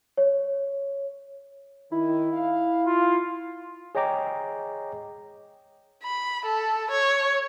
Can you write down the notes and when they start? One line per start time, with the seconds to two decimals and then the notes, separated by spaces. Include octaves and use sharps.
0.18 C#5
1.92 D#3 E4
2.33 F5
2.87 F4
3.95 G#4 C#5 D#5 G5 A#5 D6
6.03 B5
6.45 A4
6.91 C#5